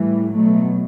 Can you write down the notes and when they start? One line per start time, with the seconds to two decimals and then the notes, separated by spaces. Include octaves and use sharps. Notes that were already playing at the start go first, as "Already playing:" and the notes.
Already playing: A2 E3 G3
0.33 B2 F#3 A3